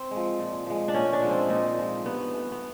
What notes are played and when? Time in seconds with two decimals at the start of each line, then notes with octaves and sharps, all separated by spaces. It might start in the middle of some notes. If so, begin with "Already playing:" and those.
Already playing: C4
0.11 G#3
0.16 F3
0.39 A#2
0.66 F3 G#3
0.88 D4
0.94 A#2 C#4
1.13 D4
1.22 F3 G#3
1.31 C4
1.50 A#2 D#4
1.78 F3 G#3
2.04 G2 B3
2.33 E3 A3
2.52 B3